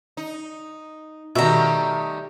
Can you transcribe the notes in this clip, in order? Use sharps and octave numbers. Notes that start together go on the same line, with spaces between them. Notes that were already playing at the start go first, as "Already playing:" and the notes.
D#4
B2 D#3 G3 A3 E5 A#5